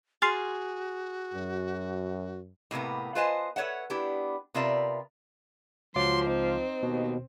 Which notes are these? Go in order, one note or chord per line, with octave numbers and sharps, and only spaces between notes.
F#4 G#4 C6 F6 A6
F#2
A2 C3 A#3 B3
F4 B4 C5 D#5 G#5 A5
A4 B4 C#5 E5 F#5
B3 D4 E4 G4
C3 B3 F4 A#4 D5 E5
C#2 F3 F#3 F4 C6 D6
C4 D#4
D#2 B2